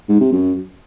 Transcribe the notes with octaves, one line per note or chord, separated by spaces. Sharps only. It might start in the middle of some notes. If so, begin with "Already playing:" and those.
G#2
C3
F#2